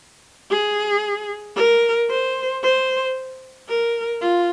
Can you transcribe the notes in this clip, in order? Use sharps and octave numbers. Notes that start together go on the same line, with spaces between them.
G#4
A#4
C5
C5
A#4
F4